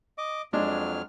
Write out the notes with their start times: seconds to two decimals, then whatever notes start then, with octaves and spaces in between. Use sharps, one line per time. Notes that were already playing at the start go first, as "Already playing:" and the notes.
0.18 D#5 D6
0.53 F2 F#3 G#3 D4 F6